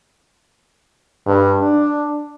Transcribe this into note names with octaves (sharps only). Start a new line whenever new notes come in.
G2
D4